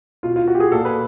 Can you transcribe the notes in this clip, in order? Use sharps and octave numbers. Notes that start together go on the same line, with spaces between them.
B2 F4
F4
F#4
G4
G#4
A#2 A4
B4